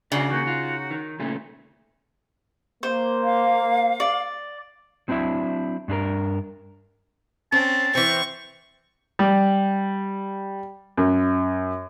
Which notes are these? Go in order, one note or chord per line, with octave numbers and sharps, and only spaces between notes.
C#3 D4 F#4 A#4 D5
D#3 A#3 D#4 F#4
F4
D#3
A#2 C#3 A3
A#3 C5
F5
D5
F#3 C4 D4 E4 E5
G2 D4 G#4 A#4
C4 C#4 A5
E3 C4 C#6
G3
F#2